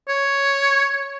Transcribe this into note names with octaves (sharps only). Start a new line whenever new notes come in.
C#5